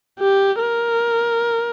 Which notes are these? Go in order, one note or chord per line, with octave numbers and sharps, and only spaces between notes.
G4
A#4